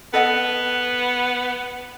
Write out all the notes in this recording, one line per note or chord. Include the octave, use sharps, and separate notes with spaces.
B3 A4 D#5 F#5